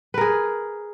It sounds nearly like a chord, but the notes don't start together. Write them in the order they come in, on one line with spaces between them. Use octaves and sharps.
B4 A#4 G#4